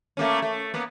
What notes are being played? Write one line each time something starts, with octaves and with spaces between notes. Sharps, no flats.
A3 A#3 C#4
A3
A#3 B3